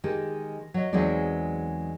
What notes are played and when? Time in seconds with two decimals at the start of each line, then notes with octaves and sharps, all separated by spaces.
0.04 D#3 G#3 G4
0.74 F#3 D#5
0.93 E2 F#3 G#3 C4 D#4 D5